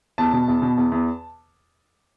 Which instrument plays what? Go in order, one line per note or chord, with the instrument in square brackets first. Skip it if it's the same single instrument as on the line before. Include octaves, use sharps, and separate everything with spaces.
[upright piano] E2 A5
B2
E2
B2
E2
E2